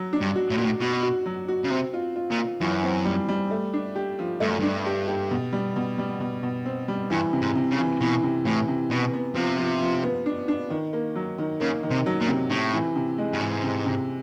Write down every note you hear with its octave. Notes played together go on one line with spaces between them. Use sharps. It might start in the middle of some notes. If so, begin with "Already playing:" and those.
Already playing: F#3
D4
G2
F#4
A2
A#2 F#4
A2
B2 F#4
F#4
F#3
F#4
C#3
C3 C4
F4
F4
A#2
F4
F#2 E3
C4
G3
G3
A3
D4
G4
F3
G2 A3
F#2
G2 D4
G4
G4
B2
G3
B2
G3
B2
B2
C4
G3
G2 E3
C3
G#2
C3
C#3
E3
B2 E3
C3
A2 E3
C3
B2 B3
B3
C3 F3
F3
F3
B3
D4
D4
D#3
A#3
F#3
D#3
C#3 A#3
D#3
C3
F#3
A#2
C3
A2 C3
E3
C3
G#3
G2
G#2 E3
C3
C3